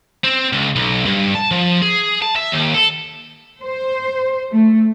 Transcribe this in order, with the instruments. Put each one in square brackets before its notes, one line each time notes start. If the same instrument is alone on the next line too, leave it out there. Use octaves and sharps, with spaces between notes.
[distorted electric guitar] C4
C#2
B1
G2
A5
F3
G#4
A5
E5
D#2
A4
[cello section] C5
A3